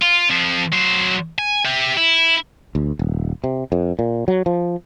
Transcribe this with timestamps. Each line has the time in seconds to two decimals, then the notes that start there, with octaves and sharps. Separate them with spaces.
0.02 F4
0.30 F2 F3
0.73 F#3 C5
1.39 G#5
1.65 G4 E5
1.97 E4
2.75 D2
2.99 D#1
3.44 C3
3.72 F2
3.99 A#2
4.28 F#3
4.46 F3